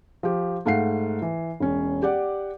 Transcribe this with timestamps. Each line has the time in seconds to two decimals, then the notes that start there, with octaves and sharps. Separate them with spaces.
0.23 F3 G4
0.65 G#2 A3 F5 F#5 C7
1.22 E3
1.60 E1 C#4
2.02 G4 D5 F#5